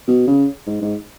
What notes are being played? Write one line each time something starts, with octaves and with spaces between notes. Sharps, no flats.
B2
C#3
G#2
G#2